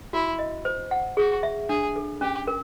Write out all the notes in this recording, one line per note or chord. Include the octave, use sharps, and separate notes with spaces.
E4 F#4
D#5
C5
F#5
F#4 G#4
E5
D4 G#4
A4
C#4 G4
A#4